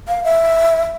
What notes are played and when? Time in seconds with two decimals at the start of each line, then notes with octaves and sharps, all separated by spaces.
0.08 F5
0.24 E5